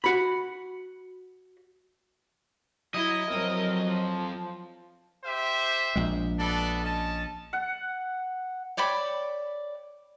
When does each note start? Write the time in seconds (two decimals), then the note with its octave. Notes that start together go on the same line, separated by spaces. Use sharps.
0.04 F#4 B5
2.94 F#3 E4 D#5
3.31 F2 F#3 C4 A#4
3.87 F3
5.24 G4 C5 E5
5.96 A#1 G#3
6.38 B3 D4 A4
6.82 C#4 D#5 A5
7.53 F#5
8.77 C#5 D5 G5 B5